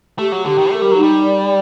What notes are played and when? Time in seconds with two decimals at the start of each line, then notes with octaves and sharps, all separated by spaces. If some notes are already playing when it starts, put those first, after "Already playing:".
0.18 A3 G4
0.32 F#3
0.45 D3 G4
0.58 D#3
0.71 A3 A#4
0.82 G3
0.92 F#3
0.97 D#4
1.03 G3
1.23 D5